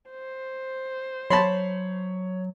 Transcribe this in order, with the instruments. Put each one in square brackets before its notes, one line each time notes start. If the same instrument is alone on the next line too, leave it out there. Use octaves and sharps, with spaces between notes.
[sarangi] C5
[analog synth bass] F#3 [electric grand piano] C#5 [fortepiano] A5 B5 C6